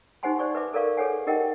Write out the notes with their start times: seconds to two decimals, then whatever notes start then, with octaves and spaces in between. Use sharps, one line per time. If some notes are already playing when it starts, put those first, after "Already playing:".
0.23 D#4 G4 C5 F#5 G#5 C6
0.39 C5 D5 C#6
0.55 B4 E5 D6
0.73 A4 A#4 D5 F5 C#6
0.97 G#4 A4 B4 C#5 F#5 G#5
1.27 D#4 G4 A#4 D#5 F#5 G5